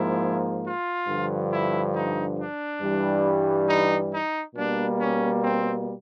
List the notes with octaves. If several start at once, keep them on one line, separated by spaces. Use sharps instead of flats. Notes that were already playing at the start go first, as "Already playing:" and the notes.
Already playing: G#2 F3 A#3 E4
F4
G2 D3 F3
E4
D#4
D4
G2 E3 G3
D#4
D#4
B2 G3 A#3 D4
C#4
C4